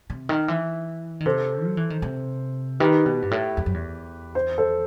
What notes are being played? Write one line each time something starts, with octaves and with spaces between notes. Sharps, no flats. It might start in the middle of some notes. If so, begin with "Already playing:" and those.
C3
D#3
E3
D#3
C3 A4 C5
F#3
E3
D#3
C3
D#3 G4 B4
B2
G2
A2
E2
F#2
E2
C5
A4 C5